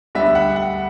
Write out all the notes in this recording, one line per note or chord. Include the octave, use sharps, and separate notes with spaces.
D2 D3 G3 B3 E5
F#5
F#5